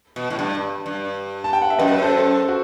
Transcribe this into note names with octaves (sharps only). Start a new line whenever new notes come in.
B2
A2
G2
G2
A5
G5
F#5
E5
F#2 B4 D#5
B4
A4 C5
F#4